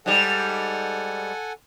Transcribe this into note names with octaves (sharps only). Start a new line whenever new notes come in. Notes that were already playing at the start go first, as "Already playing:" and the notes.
G#2 G3 A4 F#5 G#5